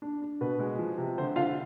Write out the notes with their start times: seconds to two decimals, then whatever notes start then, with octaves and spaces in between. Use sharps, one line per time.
0.02 D4
0.22 D4
0.41 B2 B4
0.60 G#3
0.79 F3
0.98 C3
1.18 D3 C5
1.36 D3 F4 F5